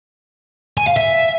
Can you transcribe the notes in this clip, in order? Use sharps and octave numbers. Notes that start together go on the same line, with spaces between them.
G#5
F5
E5